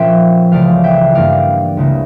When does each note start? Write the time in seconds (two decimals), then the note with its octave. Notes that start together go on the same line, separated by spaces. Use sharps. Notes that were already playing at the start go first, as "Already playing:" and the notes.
Already playing: A#2 F3 C#4 E5 G5
0.51 C#2 C#3 E3 A3 D5 F5
0.84 E5 G5
1.15 G2 E3 A#3 D5 F5
1.77 C#2 C#3 E3 A#3